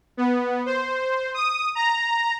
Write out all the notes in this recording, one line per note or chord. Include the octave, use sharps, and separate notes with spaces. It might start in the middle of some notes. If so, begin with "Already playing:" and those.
B3
C5
D#6
A#5